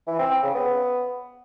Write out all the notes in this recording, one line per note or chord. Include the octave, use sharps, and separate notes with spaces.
E3
C4
C4
C#3
B3